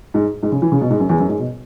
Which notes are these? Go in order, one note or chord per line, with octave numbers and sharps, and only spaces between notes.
G#2
G#2
C#3
E3
C#3
B2
G#2
F#2
E2
F#2
G#2
B2